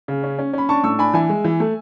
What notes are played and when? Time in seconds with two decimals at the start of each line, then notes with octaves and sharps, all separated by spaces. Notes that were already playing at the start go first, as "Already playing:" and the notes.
0.08 C#3
0.23 C#4
0.39 C#4
0.53 C#4 B5
0.69 D4 A5 C#6
0.84 A2 C#6 E6
0.99 D4 G#5 B5
1.14 E3 E5 G#5
1.29 G#3
1.45 E3
1.60 A3